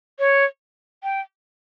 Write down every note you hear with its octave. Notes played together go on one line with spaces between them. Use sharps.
C#5
G5